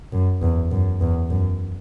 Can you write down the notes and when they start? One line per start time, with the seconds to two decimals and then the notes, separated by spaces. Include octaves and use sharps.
0.12 F#2
0.42 E2
0.71 F#2
1.01 E2
1.30 F#2